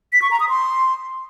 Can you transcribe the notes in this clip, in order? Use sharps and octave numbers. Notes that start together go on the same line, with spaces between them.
B6
C#6
A#5
D#6
C6